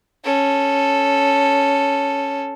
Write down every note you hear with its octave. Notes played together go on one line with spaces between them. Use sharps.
C#4 A4